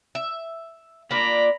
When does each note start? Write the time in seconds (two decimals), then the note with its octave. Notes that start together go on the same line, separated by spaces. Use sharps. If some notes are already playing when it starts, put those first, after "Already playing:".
0.15 E5
1.11 A#3 D4 F4 A#5 B5